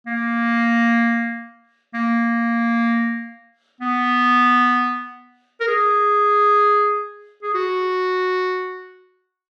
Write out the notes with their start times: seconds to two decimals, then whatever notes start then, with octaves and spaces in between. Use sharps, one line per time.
0.06 A#3
1.94 A#3
3.80 B3
5.60 A#4
5.67 G#4
7.43 G#4
7.54 F#4